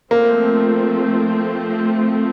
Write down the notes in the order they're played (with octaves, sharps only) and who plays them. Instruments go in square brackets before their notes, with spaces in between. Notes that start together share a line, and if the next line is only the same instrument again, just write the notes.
[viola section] F3 A3 C4 [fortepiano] A#3